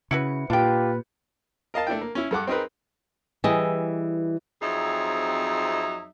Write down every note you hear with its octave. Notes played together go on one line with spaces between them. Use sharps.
C#3 E4 F#4 B4 C#7
A#2 D4 F4 G4 B4 G5
A#4 D#5 F5 A5
A3 D4 E4 G5
A#3
C#4 E4
G2 A4 F#5 D6
C4 D#4 G#4 A#4 B4
E3 G3 G#4 D#5
F2 F#3 C4 D#4 G#4 E5